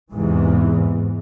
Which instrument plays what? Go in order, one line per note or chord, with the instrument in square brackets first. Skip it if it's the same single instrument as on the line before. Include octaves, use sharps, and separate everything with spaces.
[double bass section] E2 G#2 C3 E3